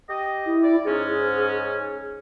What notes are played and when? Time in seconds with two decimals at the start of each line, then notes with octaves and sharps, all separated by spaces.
0.09 G4 D#5
0.46 E4
0.63 D5
0.85 G#2 C#4 G#4